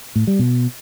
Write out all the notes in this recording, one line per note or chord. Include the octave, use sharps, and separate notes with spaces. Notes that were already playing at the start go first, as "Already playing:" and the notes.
A2
G3
B2